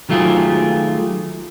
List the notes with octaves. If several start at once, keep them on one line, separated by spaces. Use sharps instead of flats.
D#3 F#3 A3 F4 G4 G#4